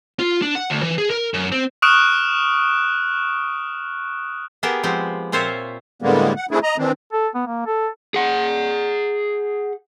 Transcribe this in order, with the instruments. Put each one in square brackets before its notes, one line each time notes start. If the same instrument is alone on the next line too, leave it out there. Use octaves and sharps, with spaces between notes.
[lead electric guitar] F4
D4
F#5
D2
E3
G#4
A#4
F#2
C4
[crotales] C#6 D#6 F6 F#6 D7 E7
[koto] B3 G4 G#4 A#4 G5 A5
F3 G#3 B3 C4 G4
A#2 C4 F4 C5 C#5 E5
[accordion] A2 D3 G3 G#3 A#3 B3
F#5
A3 C4 D4 E4 G#4
D#5 A#5
D#3 E3 C4 D4
[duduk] A4
B3
A#3
A4
[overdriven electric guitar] G#4 F#5